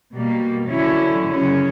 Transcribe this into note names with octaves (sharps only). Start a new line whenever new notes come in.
B2 G3 A#3
D3 F#3 C#4 E4
F#2 C#3 F#3 C#4